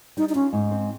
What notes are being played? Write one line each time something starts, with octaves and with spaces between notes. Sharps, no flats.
G3 D#4
D#4
C#4 F4
G#2
C4